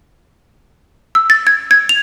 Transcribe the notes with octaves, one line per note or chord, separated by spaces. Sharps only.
E6
A6
G#6
G#6
F7